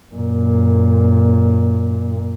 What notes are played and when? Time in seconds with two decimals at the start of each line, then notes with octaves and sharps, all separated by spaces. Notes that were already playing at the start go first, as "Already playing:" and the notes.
0.13 F#2 A#2